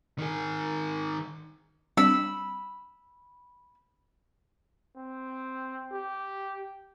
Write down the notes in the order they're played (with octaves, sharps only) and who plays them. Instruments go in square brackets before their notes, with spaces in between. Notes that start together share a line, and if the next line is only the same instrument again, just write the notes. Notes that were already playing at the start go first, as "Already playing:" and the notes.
[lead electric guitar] D#3 G#4
[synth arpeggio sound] G3 C4 D4 [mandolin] B5 E6
[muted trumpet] C4
G4